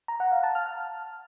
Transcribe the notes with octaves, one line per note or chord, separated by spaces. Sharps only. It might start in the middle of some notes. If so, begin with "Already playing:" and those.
A#5
F#5
F5
A5
F6